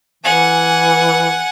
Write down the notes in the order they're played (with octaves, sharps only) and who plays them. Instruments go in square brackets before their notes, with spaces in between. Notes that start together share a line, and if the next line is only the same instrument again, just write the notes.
[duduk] E3 [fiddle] F#5 G#5